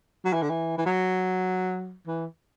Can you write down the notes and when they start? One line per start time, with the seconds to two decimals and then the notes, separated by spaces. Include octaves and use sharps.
0.25 F#3
0.33 E3
0.42 D3
0.49 E3
0.77 E3
0.86 F#3
2.07 E3